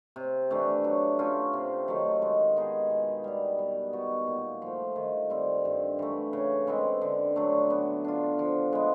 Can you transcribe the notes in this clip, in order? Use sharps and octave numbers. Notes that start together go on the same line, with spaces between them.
C3
E3 A3 D4
F#3
A3 C#4 F4
C3
D#3 F#3 A3
G#3
B3 D#4 G#4
B2
G3 B3
G3
B3 D#4 F#4
A#2
F3 A3
D#3
G3 C4
G2
E3 A3
C#3
E3 G#3 C4
D3
F#3 A3 D4
B3
D4 F4
F3
G#3 B3